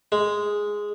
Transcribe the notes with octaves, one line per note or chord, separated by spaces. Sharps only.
G#3